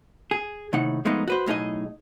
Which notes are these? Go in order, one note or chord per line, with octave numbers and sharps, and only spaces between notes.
G#4
D#2 A2 C3 D#4 F#5
F3 G#3 A3 B3 D#4
F#4 B4 C5
B1 A2 D#4 G#4 D#5